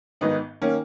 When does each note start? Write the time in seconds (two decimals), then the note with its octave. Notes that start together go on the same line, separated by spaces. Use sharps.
0.21 G#1 G#2 D#3 B3 D#4
0.62 D#3 A#3 C#4